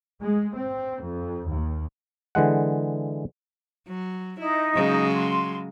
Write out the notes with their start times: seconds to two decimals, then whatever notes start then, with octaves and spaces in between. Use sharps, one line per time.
0.22 G#3
0.55 C4
1.00 F2
1.49 D#2
2.35 D3 E3 G#3 F#5
3.88 F#3
4.39 D#4 E4
4.75 C#3 F#3 G#3
5.15 C6